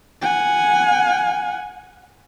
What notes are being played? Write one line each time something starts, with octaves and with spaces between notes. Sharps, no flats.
F#5 G#5